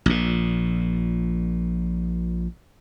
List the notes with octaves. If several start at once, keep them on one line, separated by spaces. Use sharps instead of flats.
A#1 A#2